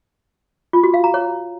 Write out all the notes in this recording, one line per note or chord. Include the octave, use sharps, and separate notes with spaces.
F4
F#4
F5
A#5
C#5